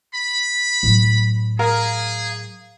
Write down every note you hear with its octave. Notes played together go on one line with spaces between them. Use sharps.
B5
A2 F#3
G#4 A#4 F5 A#5